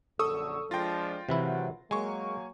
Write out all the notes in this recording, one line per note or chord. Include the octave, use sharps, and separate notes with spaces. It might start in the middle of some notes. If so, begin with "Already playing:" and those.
A#1 F#2 D3 A4 C#6 D#6 E6
F3 G#3 D4 F4 G5 C6 A6 A#6
G#1 C3 E3 F#3 E4 F#4
F#3 G#3 A#3 G#5 C#6